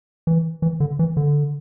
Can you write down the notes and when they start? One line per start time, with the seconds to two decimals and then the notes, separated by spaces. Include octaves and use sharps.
0.27 E3
0.62 E3
0.80 D3
0.99 E3
1.17 D3